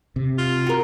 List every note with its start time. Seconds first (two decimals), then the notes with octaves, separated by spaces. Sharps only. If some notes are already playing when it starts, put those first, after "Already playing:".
0.16 C3
0.38 F4
0.66 F#4 A#4